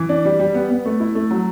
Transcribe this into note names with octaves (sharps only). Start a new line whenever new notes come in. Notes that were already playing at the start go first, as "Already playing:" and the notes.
Already playing: E3
D4
G3
G3
B3
B3
A3
E4
A3
F#3